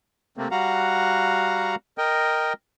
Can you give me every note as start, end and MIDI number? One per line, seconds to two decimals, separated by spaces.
0.37 0.48 48
0.37 0.48 57
0.37 0.48 58
0.37 0.48 60
0.51 1.75 55
0.51 1.75 66
0.51 1.75 77
0.51 1.75 78
0.51 1.75 82
1.98 2.53 70
1.98 2.53 75
1.98 2.53 79